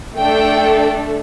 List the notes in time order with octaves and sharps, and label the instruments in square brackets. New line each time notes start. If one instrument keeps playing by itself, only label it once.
[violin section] A3 D4 A4 G5